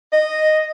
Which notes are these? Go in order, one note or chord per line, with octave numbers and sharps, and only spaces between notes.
D#5